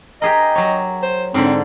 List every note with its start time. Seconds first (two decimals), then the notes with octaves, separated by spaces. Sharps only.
0.22 G4 G#4 A#4 D#5
0.55 F#3 C#5
1.02 C5
1.34 G#2 D3 C4